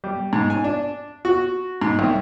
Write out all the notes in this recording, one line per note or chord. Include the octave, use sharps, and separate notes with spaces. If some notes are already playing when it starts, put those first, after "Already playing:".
G3
G#2
G#5
D4
F#4
G#2
C2